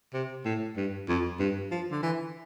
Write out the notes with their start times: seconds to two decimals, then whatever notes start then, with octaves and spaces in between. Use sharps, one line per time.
0.14 C3
0.45 A2
0.77 G2
1.08 F2
1.40 G2
1.71 F3
1.91 D3
2.03 E3